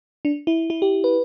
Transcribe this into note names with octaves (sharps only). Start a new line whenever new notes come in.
D4
E4
E4
G4
B4